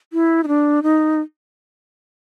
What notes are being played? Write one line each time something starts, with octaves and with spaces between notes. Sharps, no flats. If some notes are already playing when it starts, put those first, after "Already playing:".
E4
D#4
D4
D#4